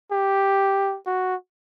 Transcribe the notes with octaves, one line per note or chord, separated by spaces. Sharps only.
G4
F#4